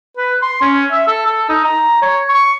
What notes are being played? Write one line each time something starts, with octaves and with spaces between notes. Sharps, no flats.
B4
C6
C#4
E5
A4
A4
D#4
A#5
C#5
C#6